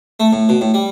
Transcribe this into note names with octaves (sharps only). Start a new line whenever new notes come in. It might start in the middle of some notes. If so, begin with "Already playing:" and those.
A3
A2
B2
A2
G3